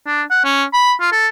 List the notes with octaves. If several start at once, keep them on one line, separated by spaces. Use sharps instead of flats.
D4
F#5
C#4
B5
F4
A4